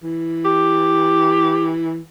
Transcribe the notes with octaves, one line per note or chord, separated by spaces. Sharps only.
E3
G4